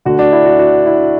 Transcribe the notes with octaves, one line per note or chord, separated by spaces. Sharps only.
D2 D3 F#4
D4
E4
F#4
F#4
E4